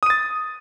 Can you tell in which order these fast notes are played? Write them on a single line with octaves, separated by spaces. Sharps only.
D#6 D#7 A6